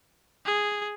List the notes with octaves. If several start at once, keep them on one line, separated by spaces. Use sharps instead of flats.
G#4